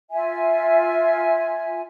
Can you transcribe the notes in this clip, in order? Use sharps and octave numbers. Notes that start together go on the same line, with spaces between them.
F4 E5 G#5